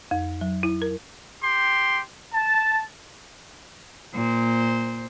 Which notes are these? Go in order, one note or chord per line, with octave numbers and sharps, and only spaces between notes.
F2
F#3
E4
A#4
G4 G5 C6
A5
A#2 C5